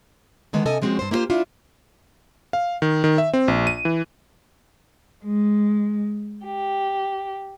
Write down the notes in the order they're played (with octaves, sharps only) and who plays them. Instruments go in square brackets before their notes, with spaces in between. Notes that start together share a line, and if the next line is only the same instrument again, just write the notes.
[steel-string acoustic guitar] D3 D#3 G#3 B3
C3 A4 D#5 G#5
F3 G#3 C4 C#4 F#4
G2 C5
A#3 E4 F4 G4 C5
D4 E4 F4
[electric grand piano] F5
D#3
D#3
E5
C4
A#1
D#7
E3
[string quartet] G#3
G4